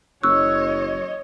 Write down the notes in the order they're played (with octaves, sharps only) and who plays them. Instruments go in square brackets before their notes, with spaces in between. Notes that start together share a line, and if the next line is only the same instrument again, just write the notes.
[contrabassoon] F#1 [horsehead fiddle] C#5 D#5 [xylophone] C#6 E6 F#6